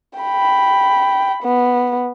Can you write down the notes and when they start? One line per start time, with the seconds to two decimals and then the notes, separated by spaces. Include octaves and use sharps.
0.19 G5 B5
1.43 B3